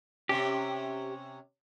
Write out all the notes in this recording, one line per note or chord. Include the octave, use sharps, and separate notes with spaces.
C3 C#4 G4